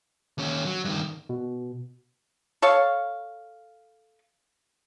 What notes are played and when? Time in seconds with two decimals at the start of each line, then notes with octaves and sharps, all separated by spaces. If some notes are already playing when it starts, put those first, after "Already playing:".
0.38 D#2 C#4
0.66 F#3
0.85 G2 D#3
1.29 B2
2.62 A4 C#5 F5